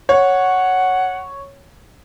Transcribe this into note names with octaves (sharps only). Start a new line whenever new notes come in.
C#5 F#5